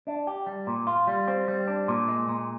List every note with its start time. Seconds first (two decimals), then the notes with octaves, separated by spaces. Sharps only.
0.07 D4
0.27 G4
0.47 G3
0.67 A#2
0.87 F4
1.07 G3
1.28 C4
1.48 G3
1.67 D4
1.88 A#2
2.08 G#3
2.29 A#2